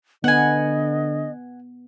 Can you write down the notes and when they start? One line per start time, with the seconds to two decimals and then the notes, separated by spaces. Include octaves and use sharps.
0.24 D3 B3 D#5 F#5 G#5